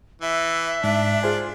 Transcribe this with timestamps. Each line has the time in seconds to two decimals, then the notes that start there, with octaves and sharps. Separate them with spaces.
0.22 E3 E5
0.83 G#2 D4
1.23 F4 G#4 C5 G#5